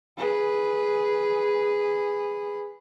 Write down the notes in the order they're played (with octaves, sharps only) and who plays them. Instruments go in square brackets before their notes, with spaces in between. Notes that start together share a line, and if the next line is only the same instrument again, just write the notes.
[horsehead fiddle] G#4 B4